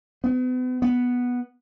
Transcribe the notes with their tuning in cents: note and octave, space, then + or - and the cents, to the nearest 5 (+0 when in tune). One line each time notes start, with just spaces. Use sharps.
B3 +40
B3 -5